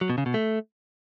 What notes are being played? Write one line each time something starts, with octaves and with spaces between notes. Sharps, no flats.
F#3
B2
C#3
B2
A3